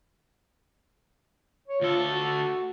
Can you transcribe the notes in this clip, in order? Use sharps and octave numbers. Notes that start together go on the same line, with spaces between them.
C#5
D2 F4 A4
F#4